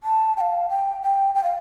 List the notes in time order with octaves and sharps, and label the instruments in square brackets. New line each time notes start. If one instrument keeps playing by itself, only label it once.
[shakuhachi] A5
G5
F5
G5
G5
G5
F5